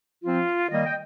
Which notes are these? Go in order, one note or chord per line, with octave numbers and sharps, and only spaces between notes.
F3 C4 F4
D#3 G3 A#3 D#5
G5